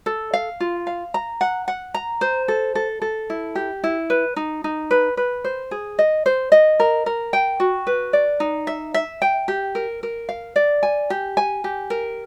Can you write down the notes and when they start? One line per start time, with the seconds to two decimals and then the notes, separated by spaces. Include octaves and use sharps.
0.06 A4
0.33 F5
0.60 F4
0.87 F5
1.14 A#5
1.41 F#5
1.68 F#5
1.94 A#5
2.21 C5
2.48 A4
2.75 A4
3.02 A4
3.30 E4
3.55 G4
3.84 E4
4.10 B4
4.36 D#4
4.64 D#4
4.91 B4
5.17 B4
5.44 C5
5.71 G#4
5.99 D#5
6.26 C5
6.52 D#5
6.80 A#4
7.06 A#4
7.33 G5
7.60 F#4
7.87 B4
8.13 D5
8.40 D#4
8.67 E5
8.94 E5
9.22 G5
9.48 G4
9.75 A#4
10.03 A#4
10.29 F5
10.56 D5
10.83 G#5
11.10 G4
11.37 G#5
11.64 G4
11.90 A#4